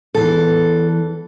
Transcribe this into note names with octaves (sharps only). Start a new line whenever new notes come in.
E2 E3 A4